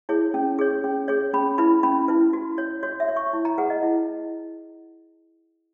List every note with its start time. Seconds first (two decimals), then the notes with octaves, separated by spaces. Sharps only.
0.09 E4 G#4 C#5
0.34 C#4
0.59 G#4 C#5
0.84 C#4
1.08 G#4 C#5
1.34 C#4 B5
1.58 E4 B4 B5
1.83 C#4 B5
2.08 E4 B4
2.33 F#4
2.58 C#5
2.83 F#4 C#5
3.00 E5
3.08 C#5
3.16 C#6
3.33 E4
3.45 A#5
3.58 G#4 B4 F#5
3.70 D#5
3.83 E4